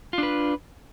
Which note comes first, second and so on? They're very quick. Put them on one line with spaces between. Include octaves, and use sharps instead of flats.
F4 D4 B4